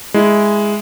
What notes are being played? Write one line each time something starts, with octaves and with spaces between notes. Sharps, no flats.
G#3 E4